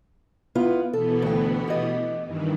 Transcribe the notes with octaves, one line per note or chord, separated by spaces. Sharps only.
B3 E4 F4
B2 E3 B3 A4
D2 G5
G4 D#5
G2 D#3 E3